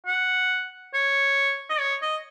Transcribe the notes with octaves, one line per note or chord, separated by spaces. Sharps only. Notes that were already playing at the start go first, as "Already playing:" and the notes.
F#5
C#5
D#5
C#5
D#5